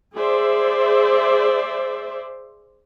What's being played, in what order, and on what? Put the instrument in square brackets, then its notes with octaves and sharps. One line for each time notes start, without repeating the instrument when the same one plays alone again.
[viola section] G#4 C5 D5 E5